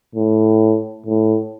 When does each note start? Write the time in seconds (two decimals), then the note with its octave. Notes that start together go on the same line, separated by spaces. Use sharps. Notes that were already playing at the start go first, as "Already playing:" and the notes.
0.15 A2
1.06 A2